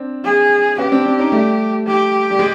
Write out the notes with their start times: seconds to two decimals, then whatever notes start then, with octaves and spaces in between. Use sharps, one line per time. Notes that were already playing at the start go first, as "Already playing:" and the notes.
Already playing: C4 D4
0.25 G#4
0.78 B3 C#4 G4
0.92 C4 D4
1.05 C4 D4
1.19 C#4 D#4
1.32 G3 A3
1.86 G4
2.30 G3
2.39 G#3